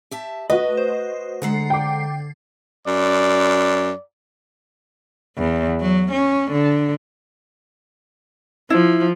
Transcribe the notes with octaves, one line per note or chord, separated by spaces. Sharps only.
G4 E5 A5
A3 F#4 B4 D#5
C5
D3 G#3 A4 F#5 A#5 C7
G5 D6
F#2 D5
E2
F#3
C#4
D3
F3 E4